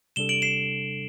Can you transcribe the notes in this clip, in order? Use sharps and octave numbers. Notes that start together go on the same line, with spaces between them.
C3 G3 D4 A4 E7 G7
D7 F#7
C7 E7